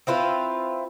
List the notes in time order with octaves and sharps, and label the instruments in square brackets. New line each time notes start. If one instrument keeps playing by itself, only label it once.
[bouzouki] C4 E4 F4 B4